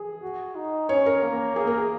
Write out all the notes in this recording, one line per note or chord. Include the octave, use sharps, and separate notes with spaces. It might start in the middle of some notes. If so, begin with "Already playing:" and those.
Already playing: G#4
F#4
D#4
C#4 C#5
A#4
A#3
A#3 G#4
A#4
G#4